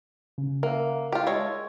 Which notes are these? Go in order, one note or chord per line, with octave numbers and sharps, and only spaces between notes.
C#3
A#3 A#4 E5 F#5
F4 G4
G#3 A4 C#5